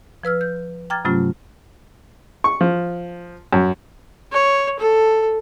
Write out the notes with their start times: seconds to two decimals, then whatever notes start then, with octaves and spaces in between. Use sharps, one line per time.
0.23 F3 B4 E6 F6
0.41 G6
0.90 G5 A#5 D6 F6 G#6 A6
1.05 G2 C3 F#3 A3 C#4 F4
2.44 C#6
2.61 F3
3.53 F#2
4.32 C#5
4.79 A4